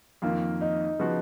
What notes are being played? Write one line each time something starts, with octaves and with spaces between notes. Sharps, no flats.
F2 D#3 A#3 F4
D#4
C#3 F3 B3 F#4